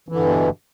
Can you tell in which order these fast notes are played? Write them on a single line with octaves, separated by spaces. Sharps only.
E3 D3 G2 B2